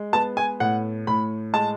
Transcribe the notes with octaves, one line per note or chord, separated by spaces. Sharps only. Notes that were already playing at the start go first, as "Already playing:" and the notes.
Already playing: G#3
B3 A5
G#5
A2 F#5
A2 B5
G#3 A5